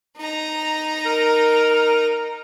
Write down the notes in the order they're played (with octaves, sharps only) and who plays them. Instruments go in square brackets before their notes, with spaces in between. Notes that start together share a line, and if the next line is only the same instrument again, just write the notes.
[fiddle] D#4 A#5
[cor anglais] A#4